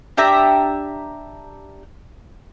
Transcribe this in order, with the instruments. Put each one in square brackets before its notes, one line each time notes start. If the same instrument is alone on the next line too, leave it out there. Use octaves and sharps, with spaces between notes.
[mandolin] D4 G4 E5 A#5